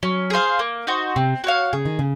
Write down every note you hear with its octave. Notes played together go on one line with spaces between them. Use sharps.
F#3 C#4
G#4 C5 F5
A#3
D#4 F#4 C5
C3 C4
F#4 C#5 F5
C#3 G#4
D#3
C#3